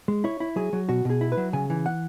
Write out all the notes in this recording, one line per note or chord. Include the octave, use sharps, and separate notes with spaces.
G#3
E4 C#5
E4
F#3 G#4
F#3
B2 F#4
B2
G#4
E4
B4
F#3
C#3 G#5
E3
F#5